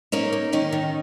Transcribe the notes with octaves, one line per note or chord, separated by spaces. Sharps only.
A#3 C#4 D#4
A#3
D#3 C#4 D#4
D#3